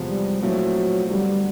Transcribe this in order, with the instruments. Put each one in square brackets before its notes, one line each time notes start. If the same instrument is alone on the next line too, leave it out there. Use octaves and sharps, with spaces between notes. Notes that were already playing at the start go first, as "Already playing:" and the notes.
Already playing: [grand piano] E2 C3 F3 G#3 B3
[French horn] G3
[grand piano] A#2 F3 A3 C4 E4 [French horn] F#3
[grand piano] G2 D3 F#3 B3 [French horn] G3